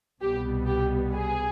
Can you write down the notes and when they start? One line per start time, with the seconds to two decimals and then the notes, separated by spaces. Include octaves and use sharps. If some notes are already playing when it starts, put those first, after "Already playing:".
0.21 C2 B2 G3 B3 G4
0.67 G4
1.14 G#4